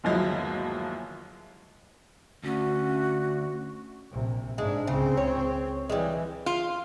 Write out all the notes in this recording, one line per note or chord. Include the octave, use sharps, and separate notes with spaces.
G1 D#2 F3 F#3 G#3 E4
D2 C#4 F#4
A#1 C3
G#2 G#3 D4
C#2 C#3 C4
C#5
E3 G3 G#3
F4